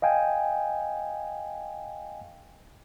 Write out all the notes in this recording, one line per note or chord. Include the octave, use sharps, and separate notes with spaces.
D#5 F5 G5 G#5